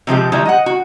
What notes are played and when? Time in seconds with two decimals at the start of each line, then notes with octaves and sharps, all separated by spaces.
0.07 C3 F3 G#3 G4
0.32 D#3 F3 G3 G#3 E4
0.45 D#5 F#5
0.66 F#4